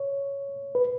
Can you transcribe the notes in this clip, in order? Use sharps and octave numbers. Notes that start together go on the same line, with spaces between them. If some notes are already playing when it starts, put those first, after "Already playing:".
Already playing: C#5
B4